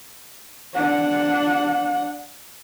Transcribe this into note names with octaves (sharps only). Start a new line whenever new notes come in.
D4 F#5